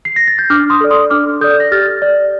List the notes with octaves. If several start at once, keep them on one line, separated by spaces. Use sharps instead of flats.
C7
A#6
A6
G6
D4 D6 F6
C6 D#6
A4 D5
C6 D#6
D4 D6 F6
A4 D5 D#6 G6
A#6
G4 F6 A6
D5